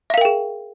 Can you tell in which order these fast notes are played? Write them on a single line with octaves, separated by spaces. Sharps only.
E5 F5 A#4 G5 G#4